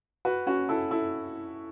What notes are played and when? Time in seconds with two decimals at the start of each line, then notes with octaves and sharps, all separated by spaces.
0.25 F#4 B4
0.47 C#4 F#4
0.69 E4 A4
0.91 E4 A4